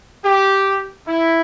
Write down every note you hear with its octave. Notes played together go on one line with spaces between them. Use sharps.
G4
E4